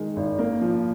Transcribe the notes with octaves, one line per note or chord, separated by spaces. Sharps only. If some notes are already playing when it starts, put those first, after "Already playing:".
Already playing: D#3 G#3
G#1
A#3
F3